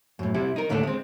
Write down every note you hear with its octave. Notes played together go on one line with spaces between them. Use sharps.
F#2 A2
C3 G3 E4
D#4 A#4
D#2 A2 D3 A3 C4 D4
G#3 C4